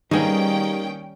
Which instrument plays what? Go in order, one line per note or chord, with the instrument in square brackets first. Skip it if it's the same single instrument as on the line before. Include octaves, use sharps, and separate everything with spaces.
[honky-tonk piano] D#3 A#3 B3 [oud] G3 [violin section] C#4 G5 [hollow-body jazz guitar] D#4 G#4